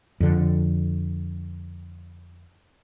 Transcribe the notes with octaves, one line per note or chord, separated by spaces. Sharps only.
F2 D3